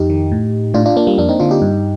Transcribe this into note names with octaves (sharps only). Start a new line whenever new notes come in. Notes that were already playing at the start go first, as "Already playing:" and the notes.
Already playing: F2 D#4 G4
D#3
A2
A2 D4 F4
D4 F4
A#3 D4
G3 A#3
F2 A#3 D4
C4 D#4
D3 D4 F4
D#4 G4
G2